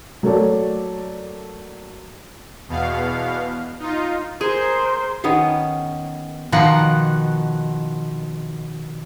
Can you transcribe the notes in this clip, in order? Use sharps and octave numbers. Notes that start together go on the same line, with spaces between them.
F#3 A3 A#3 A4 C#5 D5
E2 B2 B3 F5
D#4 F4
G#4 A#4 C5
D#3 B3 C#4 G#4
B2 D#3 F3 F#5